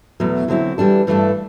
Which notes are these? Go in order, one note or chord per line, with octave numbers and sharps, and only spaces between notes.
E2 B2 F#3 A3
D3 F#3 C4 E4
E3 G3 D4 A4
G2 E3 A3 D4 A4